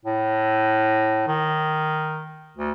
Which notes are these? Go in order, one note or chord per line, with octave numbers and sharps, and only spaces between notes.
A2
D#3
D2